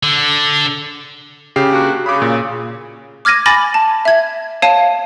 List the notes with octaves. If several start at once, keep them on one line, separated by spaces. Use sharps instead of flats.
D3
C#3 G4 C7
A#3 D4 F#4
C#3 B5 D6
A#2
D6 F6 G#6 A#6 D#7
G#5 B5 D6 A6 A#6 F#7
A5
E5 G#6
C#5 F5 A5 D#7